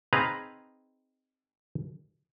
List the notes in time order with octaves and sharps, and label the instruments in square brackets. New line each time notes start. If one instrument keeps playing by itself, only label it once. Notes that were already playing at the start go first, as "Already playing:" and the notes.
[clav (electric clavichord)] C4 D#4 G#4 B4 F5 A#5